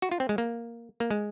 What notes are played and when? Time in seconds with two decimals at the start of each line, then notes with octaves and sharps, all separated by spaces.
0.02 F#4
0.11 F4
0.20 C4
0.29 G#3
0.38 A#3
1.00 A#3
1.11 G#3